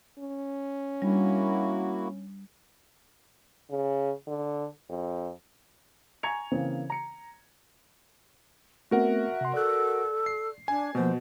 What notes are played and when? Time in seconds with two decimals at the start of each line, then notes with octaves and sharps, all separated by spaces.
0.19 C#4
1.02 G3 A#3 D4 E4 F#4
3.70 C#3
4.27 D3
4.89 F2
6.23 G#5 A#5 C#6 G#6 C#7 F7
6.51 C#3 E3 A#3 C4
6.90 A#5 C#7
8.91 A3 B3 C4 F#4 A#4 E5 F#5
9.41 C3 C6
9.54 A4 D5 F#6
10.26 C7
10.68 D4 G#5
10.95 B2 F3 A#3 F#4 C5